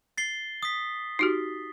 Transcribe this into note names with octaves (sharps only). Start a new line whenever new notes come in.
A6 C7 G7
D#6 B6
D#4 F#4 G4